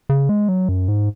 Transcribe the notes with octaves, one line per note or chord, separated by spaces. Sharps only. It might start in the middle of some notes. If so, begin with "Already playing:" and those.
C#3
G#3
F#3
F#2
G#2